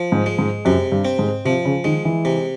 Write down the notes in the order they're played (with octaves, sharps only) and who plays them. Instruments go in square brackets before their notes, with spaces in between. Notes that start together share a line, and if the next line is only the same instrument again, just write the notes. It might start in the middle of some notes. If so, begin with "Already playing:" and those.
Already playing: [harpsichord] F3
[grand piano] G#2
[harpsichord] G#3
[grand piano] G#2
[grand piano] F#2 [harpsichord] C3
[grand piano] G2
[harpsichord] C4
[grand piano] G#2
[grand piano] C3 [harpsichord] F3
[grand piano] C#3
[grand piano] D#3 [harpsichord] G#3
[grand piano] E3
[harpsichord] C3